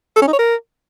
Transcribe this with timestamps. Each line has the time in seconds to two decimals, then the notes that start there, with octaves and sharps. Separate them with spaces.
0.16 A4
0.22 C#4
0.27 D#4
0.33 C#5
0.39 A#4